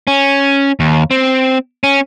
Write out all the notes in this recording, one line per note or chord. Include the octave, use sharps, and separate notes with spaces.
C#4
D#2
C4
C#4